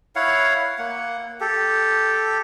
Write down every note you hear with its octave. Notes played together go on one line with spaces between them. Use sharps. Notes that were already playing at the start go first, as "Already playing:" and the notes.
E4 C#5 F5 F#5
A#3 F#5
G4 A4